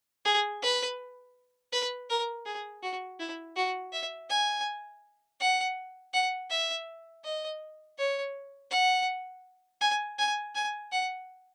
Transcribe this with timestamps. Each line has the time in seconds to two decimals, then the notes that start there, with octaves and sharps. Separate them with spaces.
0.25 G#4
0.62 B4
1.73 B4
2.09 A#4
2.46 G#4
2.83 F#4
3.20 E4
3.56 F#4
3.93 E5
4.30 G#5
5.40 F#5
6.13 F#5
6.50 E5
7.24 D#5
7.98 C#5
8.71 F#5
9.81 G#5
10.18 G#5
10.55 G#5
10.92 F#5